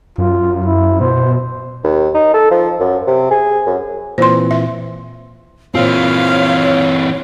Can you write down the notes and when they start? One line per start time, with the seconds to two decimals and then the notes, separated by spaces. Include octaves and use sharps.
0.18 F#2 F4
0.66 E4
1.01 B2 C5
1.84 D#2
2.14 D#4
2.34 A4
2.51 F3
2.80 F#2
3.07 C3
3.31 G#4
3.66 F#2
4.18 A#2 E3 C4 C5 C6
4.51 E5
5.75 A#2 E3 C4 C5 C#5 F5